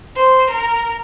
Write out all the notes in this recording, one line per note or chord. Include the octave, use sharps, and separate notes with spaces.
C5
A#4